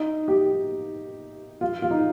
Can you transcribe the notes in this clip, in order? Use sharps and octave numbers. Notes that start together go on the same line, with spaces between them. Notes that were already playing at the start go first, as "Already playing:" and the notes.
Already playing: D#4
G4
F4
F4
D#4